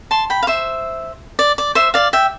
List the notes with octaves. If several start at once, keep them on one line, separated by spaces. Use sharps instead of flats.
A5 C6
G5 B5
F5
C5 E5
D5
D5
C5 E5
D5 F5
E5 G5